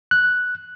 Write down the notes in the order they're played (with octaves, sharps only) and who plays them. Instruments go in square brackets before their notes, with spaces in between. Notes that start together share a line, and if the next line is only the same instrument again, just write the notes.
[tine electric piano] F#6